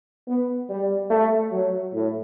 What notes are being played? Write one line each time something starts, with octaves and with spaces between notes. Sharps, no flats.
B3
G3
A3
F#3
A2